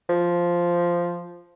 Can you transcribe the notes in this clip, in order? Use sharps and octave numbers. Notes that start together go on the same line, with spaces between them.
F3